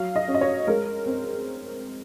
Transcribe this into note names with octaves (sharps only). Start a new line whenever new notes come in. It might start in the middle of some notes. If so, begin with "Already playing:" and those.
Already playing: F#3 F5
D#5
C#4
D#5
C#5
G#3 A#4
C4